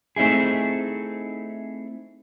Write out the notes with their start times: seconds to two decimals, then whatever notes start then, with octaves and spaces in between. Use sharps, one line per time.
0.16 A3 C4 D#4 E4 G#4